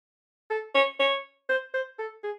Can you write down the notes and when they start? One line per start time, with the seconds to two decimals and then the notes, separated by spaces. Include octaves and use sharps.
0.50 A4
0.75 C#5
0.99 C#5
1.49 C5
1.74 C5
1.99 A4
2.23 G#4